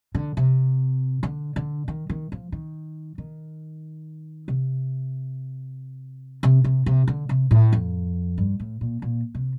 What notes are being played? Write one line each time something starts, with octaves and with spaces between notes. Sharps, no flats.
D3
C3
D3
D3
D#3
D#3
F3
D#3
D#3
C3
C3
C3
C3
D3
C3
A2
F2
G2
A2
A#2
A#2
C3